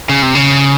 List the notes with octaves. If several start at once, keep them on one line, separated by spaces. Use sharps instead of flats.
C#3
C3
C#3